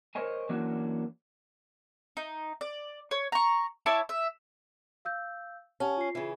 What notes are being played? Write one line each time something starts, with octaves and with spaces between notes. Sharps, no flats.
A#4 C5 C#5 D#5 G#5
E3 F#3 A#3 C#4 D4 F#4
D#4
D5
C#5
A#5 C#6
E4 C#5 A5 D6
E5
F5 E6 G6
C#4 G4 F#5 A5
F4 C7
C#3 E3